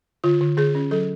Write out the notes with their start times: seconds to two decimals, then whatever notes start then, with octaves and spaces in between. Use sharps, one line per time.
0.24 D3 F4
0.41 D3
0.57 D3 G#4
0.75 C#4
0.91 F#3 A4